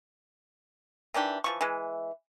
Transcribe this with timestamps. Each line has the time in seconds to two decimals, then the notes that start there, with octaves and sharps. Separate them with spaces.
1.14 D#3 E3 D4 G4
1.44 E3 F3 C#6
1.61 E3 G#3